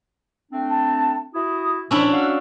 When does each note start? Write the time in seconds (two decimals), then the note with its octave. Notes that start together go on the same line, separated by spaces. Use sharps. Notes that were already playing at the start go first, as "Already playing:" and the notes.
0.52 A3 C4 D4
0.70 A5
1.34 E4 F#4 D#6
1.91 A#2 F3 C#4 D4 E4 E6
2.11 F#4 F5 F#5